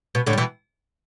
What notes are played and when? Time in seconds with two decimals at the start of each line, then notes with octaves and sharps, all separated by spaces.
0.15 B2
0.27 A2 D3
0.33 G3
0.38 B2 E3